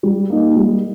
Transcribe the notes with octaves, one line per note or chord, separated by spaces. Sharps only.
G3
A#3 D#4
G3